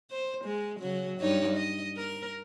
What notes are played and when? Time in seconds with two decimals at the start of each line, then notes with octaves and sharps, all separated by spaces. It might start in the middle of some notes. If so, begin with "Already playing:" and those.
0.11 C5
0.45 G#3
0.80 C#3 F#3
1.19 G2 D#4 C#5
1.56 D#5
1.97 A#4